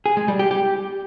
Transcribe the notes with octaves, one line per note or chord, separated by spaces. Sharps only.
G#4
G#3
G3
G4
G4